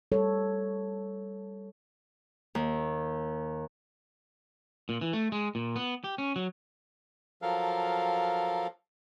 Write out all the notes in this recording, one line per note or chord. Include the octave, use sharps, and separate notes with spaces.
G3 A4 C#5
D#2
A#2
E3
A3
G#3
A#2
B3
G4
C#4
F#3
F3 F#3 A4 A#4 F5